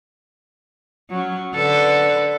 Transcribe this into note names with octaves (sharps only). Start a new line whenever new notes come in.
F#3 C#4
D3 A4 B4